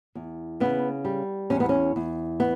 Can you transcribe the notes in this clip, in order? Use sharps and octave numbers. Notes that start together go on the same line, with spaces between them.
E2
C#3 B3
G3
E2 C#4
B3
C#4
E2
B3